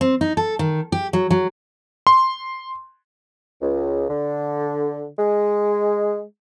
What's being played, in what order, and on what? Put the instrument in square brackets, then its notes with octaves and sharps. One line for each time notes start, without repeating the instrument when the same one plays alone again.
[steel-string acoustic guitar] C4
D#4
A4
D#3
G4
F#3
F#3
[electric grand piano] C6
[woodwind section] C#2
D3
G#3